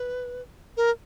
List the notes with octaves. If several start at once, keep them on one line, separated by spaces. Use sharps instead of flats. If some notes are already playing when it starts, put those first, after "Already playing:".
Already playing: B4
A#4